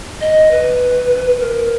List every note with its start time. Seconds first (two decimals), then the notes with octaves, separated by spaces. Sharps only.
0.21 D#5
0.51 B4
1.40 A#4